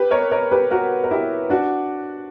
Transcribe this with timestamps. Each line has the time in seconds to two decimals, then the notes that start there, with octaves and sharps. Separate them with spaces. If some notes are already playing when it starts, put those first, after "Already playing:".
Already playing: G4 B4
0.11 A#4 C#5
0.31 A#4 C#5
0.51 G4 B4
0.71 F#4 A#4
1.03 A#4
1.11 E4 G4
1.50 D4 F#4